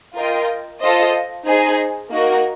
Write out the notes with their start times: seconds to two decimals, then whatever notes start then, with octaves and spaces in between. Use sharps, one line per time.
0.16 F4 A#4 D#5 G5
0.81 F4 A4 C5 D#5
1.46 D#4 G#4 C5
2.11 A#3 D#4 F#4 A#4